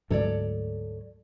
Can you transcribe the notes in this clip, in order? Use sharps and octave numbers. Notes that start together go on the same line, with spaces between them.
D2 G#2 F#3 A4 C#5 D5